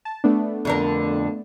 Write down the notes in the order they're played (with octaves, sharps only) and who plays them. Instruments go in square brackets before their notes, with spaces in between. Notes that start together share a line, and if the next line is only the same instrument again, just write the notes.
[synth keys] A5
A3 B3 D4
[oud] F2 D3 A#4